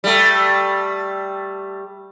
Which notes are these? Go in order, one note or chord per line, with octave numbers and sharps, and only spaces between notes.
G3 A3